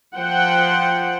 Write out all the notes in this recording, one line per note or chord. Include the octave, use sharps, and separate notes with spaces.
F3 C5 F#5 G5